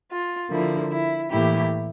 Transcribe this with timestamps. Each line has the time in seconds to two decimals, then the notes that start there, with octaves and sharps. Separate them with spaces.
0.10 F4
0.50 D3 F3 A#3 E4
0.90 E4
1.31 A2 E3 A#3 E4 G4